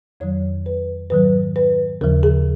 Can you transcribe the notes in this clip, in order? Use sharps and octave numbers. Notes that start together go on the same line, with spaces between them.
F2 D#3 F#3 C#5
B4
G#2 D#3 F#3 B4
B4
D#2 C#3 F3 A#4
G#4